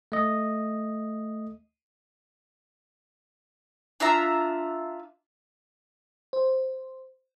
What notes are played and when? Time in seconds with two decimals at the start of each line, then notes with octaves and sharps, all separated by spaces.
0.12 A3 D#5
4.00 D4 F4 E5 A#5
6.33 C5